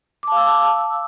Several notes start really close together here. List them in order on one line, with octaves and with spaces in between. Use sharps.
D6 A5 F5 E6